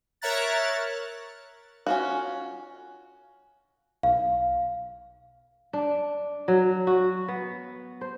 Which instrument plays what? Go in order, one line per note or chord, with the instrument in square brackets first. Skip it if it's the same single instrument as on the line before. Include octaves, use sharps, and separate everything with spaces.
[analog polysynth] A#4 C#5 E5 A#5 F#6 A6
[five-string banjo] C#4 F4 F#4
[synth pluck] B1 [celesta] F5
[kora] D4
F#3
F#4
B3
C5